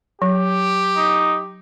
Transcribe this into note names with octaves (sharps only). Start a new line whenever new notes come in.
F#3 G4
D#4